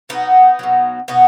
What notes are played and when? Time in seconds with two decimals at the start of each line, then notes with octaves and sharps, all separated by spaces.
0.09 B2 F#3 B3 D#4
0.59 B2 F#3
1.08 B2 B3 D#4